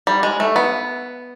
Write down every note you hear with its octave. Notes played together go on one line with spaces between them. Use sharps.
G3
G#3
A3
B3